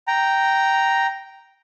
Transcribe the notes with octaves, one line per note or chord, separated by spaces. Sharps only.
G5 A#5